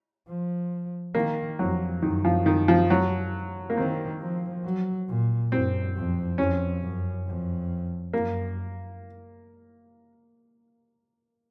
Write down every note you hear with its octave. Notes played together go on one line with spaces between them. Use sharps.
F3
D#3 A#3
F2 F#3
F#2 D#3
F3
D#3
F3
F#3
A#3
D#3 C4
F3
F#3
A#2
F#2 C4
F2
F2 C#4
F#2
F2
F#2 A#3